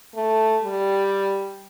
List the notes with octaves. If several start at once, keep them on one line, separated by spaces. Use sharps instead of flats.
A3
G3